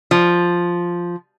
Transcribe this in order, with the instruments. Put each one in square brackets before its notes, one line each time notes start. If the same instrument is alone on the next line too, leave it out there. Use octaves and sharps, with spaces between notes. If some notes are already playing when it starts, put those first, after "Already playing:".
[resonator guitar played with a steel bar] F3